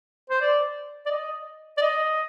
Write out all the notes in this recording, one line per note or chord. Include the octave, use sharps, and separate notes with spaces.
C5
D5
D5
D#5
D5
D#5